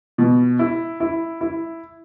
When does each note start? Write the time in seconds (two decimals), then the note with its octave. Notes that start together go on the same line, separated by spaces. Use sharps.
0.18 B2
0.59 E4
1.00 E4
1.41 E4